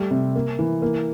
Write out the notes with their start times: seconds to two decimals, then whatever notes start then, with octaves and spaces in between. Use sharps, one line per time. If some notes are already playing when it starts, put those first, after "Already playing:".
Already playing: G3 A3
0.11 C3
0.35 A#3
0.59 E3
0.82 A#3